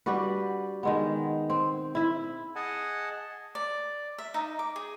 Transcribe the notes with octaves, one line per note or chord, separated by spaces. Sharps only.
G3 D4 F#4 B4
D#3 G#3 B3
C4
E4 E5
G#4 D#5 F#5 G#5 A5
D5
E5
D#4
D6
G#4